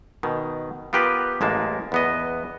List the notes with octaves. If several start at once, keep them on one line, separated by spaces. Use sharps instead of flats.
B2 D#3
B3 F4 G4 A#4 B4
A1 G#3 A#3 A5
E2 B3 D#5